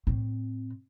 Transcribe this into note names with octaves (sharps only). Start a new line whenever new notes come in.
A2 C4